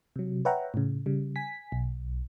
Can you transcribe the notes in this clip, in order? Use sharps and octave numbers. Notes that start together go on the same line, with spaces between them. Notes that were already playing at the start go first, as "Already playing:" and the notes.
C3 F#3
B4 C#5 E5 F#5 G5 A#5
A2 C#3
C#3 G3
G#5 B6
B1